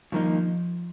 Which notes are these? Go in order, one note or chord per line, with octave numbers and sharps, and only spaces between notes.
G2 D#3 F3 A#3 D#4